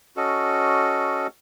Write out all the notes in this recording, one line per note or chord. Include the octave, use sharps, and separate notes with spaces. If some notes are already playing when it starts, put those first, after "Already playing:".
C#4 F#4 A4 D#5